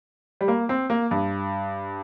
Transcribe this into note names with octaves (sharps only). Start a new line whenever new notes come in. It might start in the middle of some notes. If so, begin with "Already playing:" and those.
G3
A#3
C4
A#3
G2